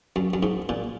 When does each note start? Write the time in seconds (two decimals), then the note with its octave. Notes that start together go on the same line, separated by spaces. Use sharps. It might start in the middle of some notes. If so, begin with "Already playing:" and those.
0.16 F#2
0.34 F#2
0.43 G#2
0.69 A#2